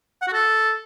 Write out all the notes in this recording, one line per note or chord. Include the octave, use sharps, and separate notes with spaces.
F#5
F#4
A4